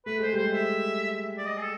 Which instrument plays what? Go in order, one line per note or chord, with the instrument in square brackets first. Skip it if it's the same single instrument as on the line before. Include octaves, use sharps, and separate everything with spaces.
[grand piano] A3 [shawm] B4
[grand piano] G#3 [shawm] C5
[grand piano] G3 [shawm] C5
[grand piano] G#3
[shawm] E5
D5
D#5
G#4
A4